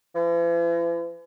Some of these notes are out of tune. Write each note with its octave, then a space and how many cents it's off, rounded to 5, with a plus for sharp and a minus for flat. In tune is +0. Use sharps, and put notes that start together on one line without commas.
E3 +45